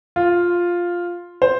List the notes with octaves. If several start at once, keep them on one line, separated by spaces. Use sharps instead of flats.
F4
C5